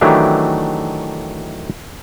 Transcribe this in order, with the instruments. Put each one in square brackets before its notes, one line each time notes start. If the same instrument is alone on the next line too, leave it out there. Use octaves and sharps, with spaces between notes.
[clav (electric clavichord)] D#3 E3 F#3 A3 D4 G4